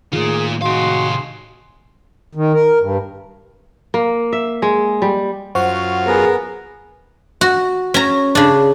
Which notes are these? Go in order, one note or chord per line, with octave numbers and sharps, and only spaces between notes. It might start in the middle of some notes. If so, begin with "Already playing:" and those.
A2 D#3 A#3 F4 G#4
C3 G#3 F#4 F5 C6
D#3
A#4
G2
A#3
E5
G#3
G3
F#2 F4 C5 F#5 C#6
B3 G#4 A#4
F#4
C#4 A#5
C#3 D4